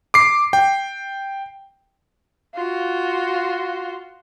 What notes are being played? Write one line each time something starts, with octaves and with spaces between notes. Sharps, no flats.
D6 C7
G5
F4 F#4